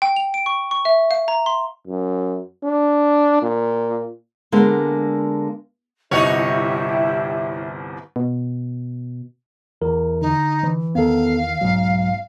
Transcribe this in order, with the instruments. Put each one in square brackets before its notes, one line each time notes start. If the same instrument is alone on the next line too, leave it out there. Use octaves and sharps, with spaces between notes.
[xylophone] G5
F7
D7
C#6
C#6
E5
F5
A#5
C6
[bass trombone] F#2
D4
A#2
[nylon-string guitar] D3 G#3 A#3 B3 D4
[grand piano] G1 C2 [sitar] D#4 F#4 C#5 [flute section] E4 G4 E5
[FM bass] B2
[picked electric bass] E2 [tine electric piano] A#4
[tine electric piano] D3 [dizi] D#4
[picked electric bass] E3
[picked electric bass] E2 D#3 [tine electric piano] B3 A4 [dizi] F5
[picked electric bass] B1 G#2 [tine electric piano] F#3